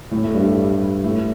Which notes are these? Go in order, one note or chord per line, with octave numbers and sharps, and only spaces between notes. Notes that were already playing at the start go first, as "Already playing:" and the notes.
A2 A3
A3
G2 G3
A2 A3